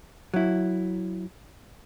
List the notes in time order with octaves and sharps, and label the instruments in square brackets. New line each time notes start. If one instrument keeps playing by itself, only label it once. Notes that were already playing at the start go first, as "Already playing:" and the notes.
[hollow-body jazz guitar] F#3 E4